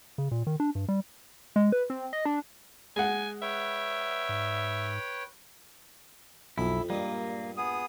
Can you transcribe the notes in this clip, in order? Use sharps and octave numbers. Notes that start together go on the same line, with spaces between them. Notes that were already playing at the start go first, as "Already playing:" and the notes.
C#3
A#2
D#3
D4
G2
G3
G#3
B4
C4
D#5
D4
G#3 F#5 G#5
B4 C#5 E5 G5
G#2
B1 F2 E4 B5
G2 A#2 G3 G#3 A#3
B3 G#4 D#6